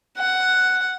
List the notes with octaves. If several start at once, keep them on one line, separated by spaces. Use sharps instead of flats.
F#5